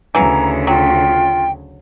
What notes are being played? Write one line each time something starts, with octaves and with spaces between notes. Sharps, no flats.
D2 C#3 E3 F#3 A#5
F#3 F4 G5